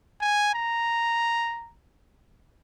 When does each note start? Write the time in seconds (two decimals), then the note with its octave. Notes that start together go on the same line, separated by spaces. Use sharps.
0.21 G#5
0.54 A#5